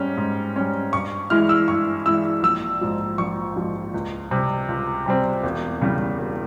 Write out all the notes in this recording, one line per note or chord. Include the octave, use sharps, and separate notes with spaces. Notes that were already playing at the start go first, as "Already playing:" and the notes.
Already playing: G#2 G3 C#4
G#2
G3 C#4
G2 C#6
E3 G#3 E4 F6
E6
G2 C#6
E3 G#3 E4 E6
A#1 E6
G#2 F3
A#1 C#6
G#2 F3
C#2
C3 G3 C4
C#2
C3 G3 C4
E1
E2 C#3 G3
E1